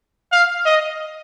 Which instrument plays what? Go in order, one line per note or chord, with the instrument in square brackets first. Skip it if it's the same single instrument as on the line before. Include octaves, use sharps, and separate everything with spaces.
[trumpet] F5
D#5